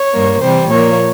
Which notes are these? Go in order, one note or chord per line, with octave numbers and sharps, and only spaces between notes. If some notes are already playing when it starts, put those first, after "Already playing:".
Already playing: C#5
G2 G3 A#3
C3 E3 G3 C5
A#2 F3 A#3 C#5